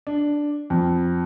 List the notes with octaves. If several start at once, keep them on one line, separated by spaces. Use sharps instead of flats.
D4
F2